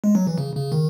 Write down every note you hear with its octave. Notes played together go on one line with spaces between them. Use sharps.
G#3
F#3
E3
C#3
C#3
D#3